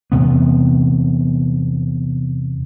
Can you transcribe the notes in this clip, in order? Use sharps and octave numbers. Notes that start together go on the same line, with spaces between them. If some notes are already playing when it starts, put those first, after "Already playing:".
E2 C3 B3